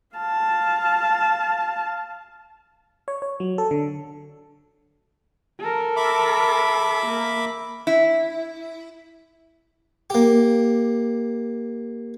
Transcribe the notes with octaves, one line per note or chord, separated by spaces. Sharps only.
F5 A5
C#5
C#5
F#3
A4
D3
A4 A#4
E5 B5 D6
A#3
E4
A#3 G4